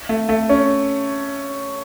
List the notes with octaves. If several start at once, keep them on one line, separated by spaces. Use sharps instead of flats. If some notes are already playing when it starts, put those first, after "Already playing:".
A3
A3
C#4